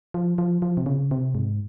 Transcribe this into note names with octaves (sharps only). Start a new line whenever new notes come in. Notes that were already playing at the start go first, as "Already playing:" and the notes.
F3
F3
F3
C3
C#3
C3
G#2